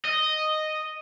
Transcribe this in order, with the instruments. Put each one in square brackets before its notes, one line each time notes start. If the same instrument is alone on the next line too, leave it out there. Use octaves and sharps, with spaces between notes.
[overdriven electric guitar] D#5